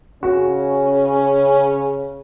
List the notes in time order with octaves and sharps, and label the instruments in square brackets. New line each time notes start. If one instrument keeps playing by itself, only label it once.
[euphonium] C#3 [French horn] C#4 [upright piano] F#4